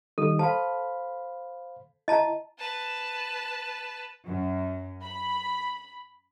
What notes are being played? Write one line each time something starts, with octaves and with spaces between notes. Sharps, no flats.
D#3 G3 D#4 A4
C5 F5 A5 B5
E4 D#5 A5 A#5
B4 A5
F#2
B5